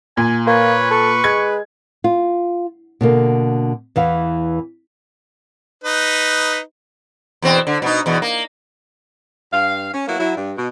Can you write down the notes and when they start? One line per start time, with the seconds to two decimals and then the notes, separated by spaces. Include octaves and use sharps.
0.17 A#2 G#5
0.47 A#3 B4 C#5
0.91 A4 C#6
1.24 G#3 G#6
2.04 F4
3.01 B2 D3 A#3
3.96 E2 E3 F5
5.84 D#4 B4
7.42 E2 B2 C4
7.67 D3
7.82 B2 D#4
8.06 E2 B2
8.22 A#3
9.52 G2 F5
9.93 C#4
10.07 F#3 A#3 B3 E4 F#4
10.20 F#3 E4
10.36 G2
10.57 B2